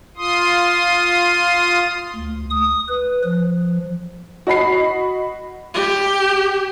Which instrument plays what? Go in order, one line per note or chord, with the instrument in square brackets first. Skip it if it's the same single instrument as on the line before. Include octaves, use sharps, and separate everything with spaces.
[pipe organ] F4 C6 D#6
D2
D#6
B4
F3
[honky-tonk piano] F#4 D#5 B5 C7
[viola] G4